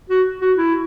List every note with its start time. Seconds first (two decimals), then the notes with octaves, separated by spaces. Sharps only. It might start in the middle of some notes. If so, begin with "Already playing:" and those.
0.10 F#4
0.41 F#4
0.57 E4